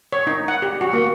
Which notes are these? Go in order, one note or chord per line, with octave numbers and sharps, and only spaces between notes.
C#5
D#4
F#5
G4
F#4
A#3